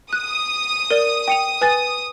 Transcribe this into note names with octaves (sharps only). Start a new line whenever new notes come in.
D#6 F#6
A#4 D5
G5 C#7 F7
B4 G#5 A6